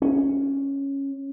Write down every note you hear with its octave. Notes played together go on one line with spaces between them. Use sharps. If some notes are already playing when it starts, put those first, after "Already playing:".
C#4